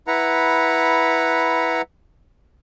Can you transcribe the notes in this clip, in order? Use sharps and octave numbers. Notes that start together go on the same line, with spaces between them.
E4 B4 F#5 A#5